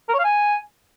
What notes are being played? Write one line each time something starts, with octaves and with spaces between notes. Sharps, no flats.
A#4
C#5
F5
G#5